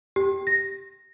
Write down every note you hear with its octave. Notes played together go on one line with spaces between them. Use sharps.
G4
A#6